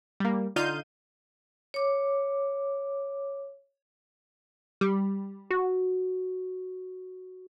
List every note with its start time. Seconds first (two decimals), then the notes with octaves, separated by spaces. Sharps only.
0.20 G3 A#3
0.56 D3 D#4 F4 F5 G6 D#7
1.74 C#5 D6
4.81 G3
5.51 F#4